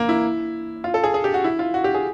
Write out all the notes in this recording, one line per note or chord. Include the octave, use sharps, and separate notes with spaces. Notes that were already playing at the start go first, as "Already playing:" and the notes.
Already playing: A#3
E4
F4
A4
G#4
G#4
G4
F#4
E4
F4
F#4
G4
G#4